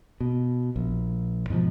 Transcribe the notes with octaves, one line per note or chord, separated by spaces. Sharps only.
B2
A#1
G#2 B2 D#3 F3